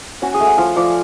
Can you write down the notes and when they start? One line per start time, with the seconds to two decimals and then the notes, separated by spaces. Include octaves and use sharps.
0.22 C#4 F#4
0.34 G#4
0.40 A3
0.46 F#5
0.58 F3 F5
0.76 F3 D5